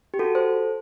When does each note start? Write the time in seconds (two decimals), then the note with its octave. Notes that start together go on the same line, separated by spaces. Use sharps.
0.14 G4
0.19 F#4 A4
0.35 A4 C5